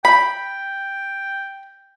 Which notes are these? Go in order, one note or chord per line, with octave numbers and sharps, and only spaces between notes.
G5 B5